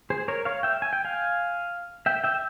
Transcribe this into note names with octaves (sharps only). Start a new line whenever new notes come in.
G#4 C5
A#4 C#5
C#5 F5
E5 G5
G#5
G5
F5 G#5
E5 G5
E5 G5